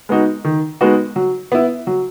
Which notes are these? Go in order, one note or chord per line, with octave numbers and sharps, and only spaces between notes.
G#3 B3 D#4 F#4
D#3
G#3 B3 D#4 F#4
F#3
B3 E4
F#3